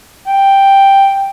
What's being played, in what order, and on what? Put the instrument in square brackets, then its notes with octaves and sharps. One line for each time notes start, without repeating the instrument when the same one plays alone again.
[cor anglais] G5